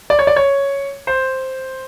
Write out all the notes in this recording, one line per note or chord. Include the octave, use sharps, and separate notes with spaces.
D5
C#5
D5
C#5
C5